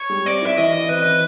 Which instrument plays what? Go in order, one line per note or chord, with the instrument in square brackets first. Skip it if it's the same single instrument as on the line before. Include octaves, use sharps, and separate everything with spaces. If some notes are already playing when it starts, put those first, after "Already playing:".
Already playing: [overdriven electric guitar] C#5
[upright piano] G3
[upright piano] C4 [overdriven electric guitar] D5
[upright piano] E4
[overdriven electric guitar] E5
[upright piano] E3 [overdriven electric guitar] D#5
[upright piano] E3
[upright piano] C4 [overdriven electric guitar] B4
[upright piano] E3